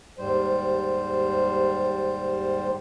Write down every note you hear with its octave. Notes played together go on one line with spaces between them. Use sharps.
D#2 G#2 G3 C5